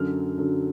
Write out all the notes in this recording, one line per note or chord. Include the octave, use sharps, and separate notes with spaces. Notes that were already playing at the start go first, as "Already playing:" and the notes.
Already playing: F#2 D3 F#3 F6
F#2 D3 F#3